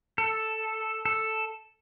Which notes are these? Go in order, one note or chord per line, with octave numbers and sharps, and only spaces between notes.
A4
A4